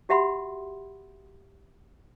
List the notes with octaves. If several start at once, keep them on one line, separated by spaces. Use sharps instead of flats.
F#4 G4 E5 F#5 B5 C6